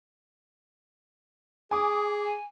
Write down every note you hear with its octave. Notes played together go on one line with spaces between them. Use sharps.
G#4 G#5 D6 D#6
G#5